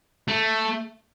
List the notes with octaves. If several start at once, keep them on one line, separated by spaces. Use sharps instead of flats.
A3